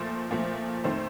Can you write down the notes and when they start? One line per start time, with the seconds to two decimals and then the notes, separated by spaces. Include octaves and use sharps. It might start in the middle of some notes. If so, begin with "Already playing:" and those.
Already playing: A#2 F3 A3 C5
0.30 A#2 F3 A3
0.84 F2 D#3 A3 C5